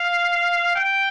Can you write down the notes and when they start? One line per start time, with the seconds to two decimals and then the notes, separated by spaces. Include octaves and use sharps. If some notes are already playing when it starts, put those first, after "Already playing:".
Already playing: F5
0.76 G5